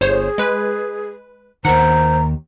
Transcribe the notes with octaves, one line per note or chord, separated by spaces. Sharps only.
G1 G#4 C5 C#5
G#3 B4
D#2 D#3 C5 F#5 A#5